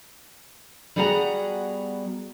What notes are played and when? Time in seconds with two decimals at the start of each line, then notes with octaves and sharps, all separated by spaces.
0.96 G3 B3 F#4 G#4 F#5 A#5